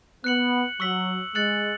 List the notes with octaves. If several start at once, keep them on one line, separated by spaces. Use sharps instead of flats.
B3 F#6 C#7 F#7
F#3 C#6 E6 B6 F#7
G#3 F#6 A6 C#7 F#7